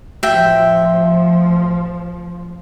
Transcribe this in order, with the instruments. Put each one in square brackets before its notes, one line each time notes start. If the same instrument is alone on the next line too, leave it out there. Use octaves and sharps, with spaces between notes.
[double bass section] A1 F3 [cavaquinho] E5 G5